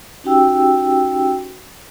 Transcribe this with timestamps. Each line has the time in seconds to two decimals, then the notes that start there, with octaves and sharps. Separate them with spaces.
0.24 C#4 D#4 F#4 G4 G5 E6